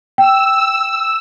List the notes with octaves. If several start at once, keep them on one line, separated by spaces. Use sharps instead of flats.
G5 E6